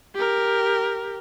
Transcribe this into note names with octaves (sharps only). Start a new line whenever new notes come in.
G4 A#4